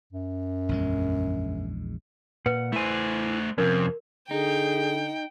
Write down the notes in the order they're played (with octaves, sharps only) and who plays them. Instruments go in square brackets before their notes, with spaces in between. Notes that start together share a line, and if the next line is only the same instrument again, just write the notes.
[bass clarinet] F#2
[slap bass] A#1 E2 G#3
[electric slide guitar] A#2 F#5 [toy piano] B4
[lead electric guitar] A3 C5 [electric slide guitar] E4 G#5
[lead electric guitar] F2 [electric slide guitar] C3 F3 C#4 [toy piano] A#4
[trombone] D3 [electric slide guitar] D#4 [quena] G#4 [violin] G5